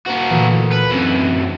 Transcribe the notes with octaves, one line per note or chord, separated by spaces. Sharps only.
A#3 D4 F#4 C5 E7
D2 A#2 E3
B4 A5 F6 C#7
F#2 C3